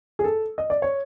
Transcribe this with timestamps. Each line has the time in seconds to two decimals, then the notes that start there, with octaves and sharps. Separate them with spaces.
0.19 G#4
0.24 A4
0.58 D#5
0.70 D5
0.82 C#5